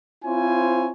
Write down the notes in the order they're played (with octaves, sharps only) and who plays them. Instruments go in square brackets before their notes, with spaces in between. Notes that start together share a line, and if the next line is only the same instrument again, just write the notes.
[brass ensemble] C4 E4 F4 C5 C#5 G#5